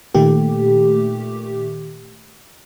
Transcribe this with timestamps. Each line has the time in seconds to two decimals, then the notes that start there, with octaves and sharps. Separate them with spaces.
0.15 A#2 D#3 A3 G4